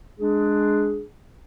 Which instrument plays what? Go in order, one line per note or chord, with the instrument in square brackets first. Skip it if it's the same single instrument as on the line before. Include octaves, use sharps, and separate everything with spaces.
[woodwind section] G#3 D4 G#4